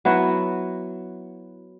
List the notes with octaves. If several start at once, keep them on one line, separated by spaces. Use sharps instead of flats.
F#3 B3 E4 F#4